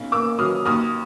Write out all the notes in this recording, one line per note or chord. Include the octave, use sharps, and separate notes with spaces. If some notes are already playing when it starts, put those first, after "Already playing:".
Already playing: B1 C#3
A#3 D6 E6
F#3 D#6 F6
D#2 D#6 F6